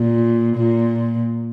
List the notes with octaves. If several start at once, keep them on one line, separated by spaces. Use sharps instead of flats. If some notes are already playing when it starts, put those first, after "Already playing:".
Already playing: A#2
A#2